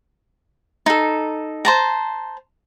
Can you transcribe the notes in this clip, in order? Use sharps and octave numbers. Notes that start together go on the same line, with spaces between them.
D#4 A4
C5 A5 A#5